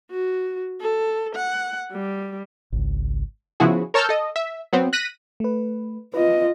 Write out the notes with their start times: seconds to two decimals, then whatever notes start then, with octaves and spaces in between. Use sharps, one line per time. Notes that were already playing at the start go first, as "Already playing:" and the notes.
0.11 F#4
0.80 A4
1.35 F#5
1.92 G3
2.72 G#1 C#2
3.60 C#3 F3 B3 E4 F#4 G#4
3.94 A#4 C#5 A5 E6 F6 G6
4.09 A4 D#5
4.36 E5
4.73 F#3 B3 C4
4.93 F#6 A#6 B6 D#7
5.40 A3 B4
6.14 F4 B4 D#5